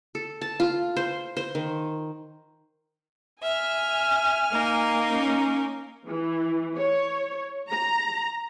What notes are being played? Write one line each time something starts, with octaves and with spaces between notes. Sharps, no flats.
A4
A5
F4
C5
C5
D#3
E5 G#5 F6
A#3 D#4 A#4
C#4
E3
C#5
A#5